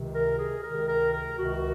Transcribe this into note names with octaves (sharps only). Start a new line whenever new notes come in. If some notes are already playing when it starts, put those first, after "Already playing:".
Already playing: C#2 C3 D#3
A#4
G#4
C#2 C3 D#3 A#4
A#4
A#4
C#2 C3 D#3 F#4